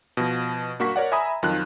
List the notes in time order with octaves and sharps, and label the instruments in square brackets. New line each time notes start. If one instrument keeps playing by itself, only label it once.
[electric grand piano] B2 F3
G2 A#3 F#4 C#6 B6
A#4 C#5 D5 F#5
E5 G#5 A#5 B5 D#6
F2 D#3 F#3 F4 F#6